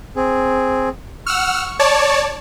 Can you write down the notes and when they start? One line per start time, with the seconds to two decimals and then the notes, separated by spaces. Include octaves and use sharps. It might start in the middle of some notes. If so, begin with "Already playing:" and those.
0.16 C4 G#4
1.26 F#5 C#6 E6 F6
1.79 C#5 D5 A5